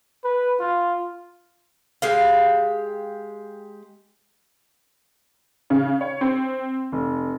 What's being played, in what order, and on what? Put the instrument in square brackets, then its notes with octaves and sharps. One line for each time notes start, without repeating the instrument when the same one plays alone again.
[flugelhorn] B4
F4
[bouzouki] G#3 G4 F5
[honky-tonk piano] C#3
C#5
C4
F1